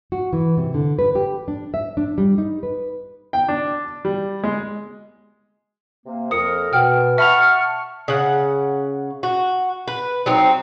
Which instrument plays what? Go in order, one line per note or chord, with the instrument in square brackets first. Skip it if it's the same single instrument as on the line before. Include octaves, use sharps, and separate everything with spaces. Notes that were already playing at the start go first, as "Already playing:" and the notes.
[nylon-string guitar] F#4
E3
C3
D3
B4
G4
D4
E5
D4
G3
D#4
B4
[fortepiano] G5
D4
G3
G#3
[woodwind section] C3 A#3
[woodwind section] F2 A#4 [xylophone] D#6 C#7
[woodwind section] B2 [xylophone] F#5 G5 F6
[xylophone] E5 B5 F7 [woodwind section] F#5 A5 C#6 [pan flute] F6
[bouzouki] C#3 F#5
F#4
B4
F#3 C4 D#4